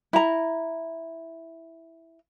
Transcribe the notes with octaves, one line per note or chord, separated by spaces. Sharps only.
E4 A#5